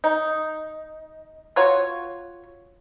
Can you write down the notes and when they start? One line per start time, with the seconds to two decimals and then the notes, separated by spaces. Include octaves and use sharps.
0.04 D#4
1.56 F4 F#4 C#5